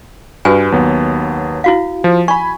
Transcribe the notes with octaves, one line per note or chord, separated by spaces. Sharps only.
G2 F#4 B4 G#5
D#2 F#3 B3
E4 F#4 F5
F3
G#5 B5 C#6